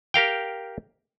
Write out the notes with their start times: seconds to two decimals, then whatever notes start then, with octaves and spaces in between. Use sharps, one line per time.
0.14 G4 A#4 F5 G5